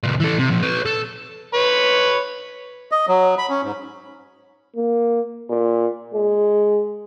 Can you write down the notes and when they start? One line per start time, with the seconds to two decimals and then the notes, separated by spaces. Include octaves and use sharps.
0.03 C#2 A#2
0.20 E3 A4
0.39 C3
0.50 A#2 F3
0.62 B4 C#5
0.86 A4
1.54 B4 C#5
2.91 D#5
3.08 F#3
3.38 B5
3.49 C#4
3.63 G#2
4.76 A#3
5.49 A#2
6.14 G#3